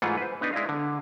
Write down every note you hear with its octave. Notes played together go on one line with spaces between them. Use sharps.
G#2 E3 A3 F4 G#4 F#5
B4 C5
B3 D4 D#4 B4
G#3 E4 D5 D#5 F5
D3